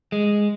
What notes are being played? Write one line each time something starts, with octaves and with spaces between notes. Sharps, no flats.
G#3